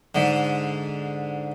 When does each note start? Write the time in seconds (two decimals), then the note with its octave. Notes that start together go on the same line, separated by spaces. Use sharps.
0.15 G#2 D3